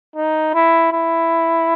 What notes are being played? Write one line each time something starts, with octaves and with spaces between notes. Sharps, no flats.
D#4
E4
E4